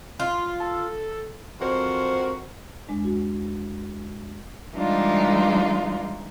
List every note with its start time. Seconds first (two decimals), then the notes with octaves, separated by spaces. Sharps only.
0.20 F4
0.60 A4
1.61 F2 F#4 A#4 C5
2.89 E2 G#3 D4
3.04 F#4
4.74 E3 G3 G#3 D4 D#4 F4